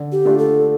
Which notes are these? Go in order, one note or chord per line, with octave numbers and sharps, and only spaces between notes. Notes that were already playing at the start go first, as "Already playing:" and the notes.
Already playing: D3
G4
A3 D4 F4
A4